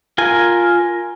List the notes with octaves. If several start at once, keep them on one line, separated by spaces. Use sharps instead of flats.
F4 A#4 G#5